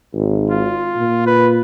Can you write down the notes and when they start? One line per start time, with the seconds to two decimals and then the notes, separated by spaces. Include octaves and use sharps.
0.14 G#1
0.50 F4
0.97 A#2
1.27 B4